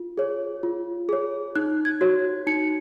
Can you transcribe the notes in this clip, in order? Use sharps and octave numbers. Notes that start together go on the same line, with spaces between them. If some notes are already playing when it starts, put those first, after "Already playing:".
Already playing: F4
G#4 C#5
F4
G#4 C#5
D#4 F#6
G#6
F#4 C#5
D#4 C#7